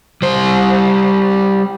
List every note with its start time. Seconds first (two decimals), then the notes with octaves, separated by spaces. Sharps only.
0.22 G3 C5